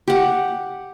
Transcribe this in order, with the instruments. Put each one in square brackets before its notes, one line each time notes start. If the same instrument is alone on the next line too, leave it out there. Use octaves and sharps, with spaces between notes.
[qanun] G4 F#5